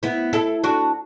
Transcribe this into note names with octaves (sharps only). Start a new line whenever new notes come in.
B3 E4
E4 A4
D4 F#4